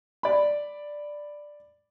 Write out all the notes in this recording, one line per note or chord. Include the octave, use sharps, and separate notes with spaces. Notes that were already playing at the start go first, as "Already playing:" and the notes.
D5 B5